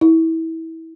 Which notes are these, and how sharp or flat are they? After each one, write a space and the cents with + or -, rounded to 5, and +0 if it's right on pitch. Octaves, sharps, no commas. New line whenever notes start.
E4 -25